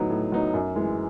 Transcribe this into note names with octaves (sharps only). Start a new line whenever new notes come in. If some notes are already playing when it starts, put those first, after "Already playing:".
Already playing: A2 F#3 B3 D#4
A2
F#3 B3 D#4
F#2
E3 G#3